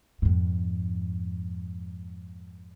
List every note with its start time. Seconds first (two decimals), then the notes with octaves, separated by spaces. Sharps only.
0.22 F2 G#2